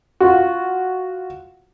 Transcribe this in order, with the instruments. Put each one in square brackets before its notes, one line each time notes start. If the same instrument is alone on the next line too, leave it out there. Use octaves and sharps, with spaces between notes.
[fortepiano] F4 F#4